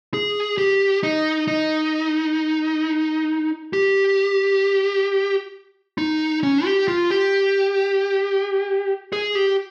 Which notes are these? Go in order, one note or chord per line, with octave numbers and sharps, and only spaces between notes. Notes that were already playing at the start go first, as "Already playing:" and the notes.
G#4
G4
D#4
D#4
G4
D#4
C#4
G4
F4
G4
G#4
G4